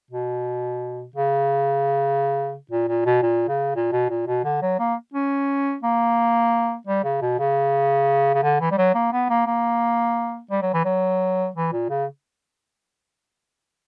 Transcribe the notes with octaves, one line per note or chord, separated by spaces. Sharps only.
B2
C#3
A#2
A#2
B2
A#2
C#3
A#2
B2
A#2
B2
D3
F#3
A#3
C#4
A#3
G3
C#3
B2
C#3
C#3
D3
E3
G3
F#3
A#3
B3
A#3
A#3
G3
F#3
E3
F#3
E3
A#2
C#3